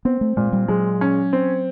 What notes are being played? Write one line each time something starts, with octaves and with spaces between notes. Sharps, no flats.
B3 C4
A3
A#2 G#3
G3
F#3 G#3
C#4
C4